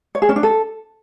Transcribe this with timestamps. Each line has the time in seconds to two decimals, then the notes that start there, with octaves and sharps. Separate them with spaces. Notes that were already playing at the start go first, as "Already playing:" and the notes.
0.15 C#5
0.22 G#4
0.29 C#4
0.36 D4
0.43 A4